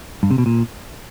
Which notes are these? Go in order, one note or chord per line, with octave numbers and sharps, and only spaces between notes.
G2
C3
B2
A#2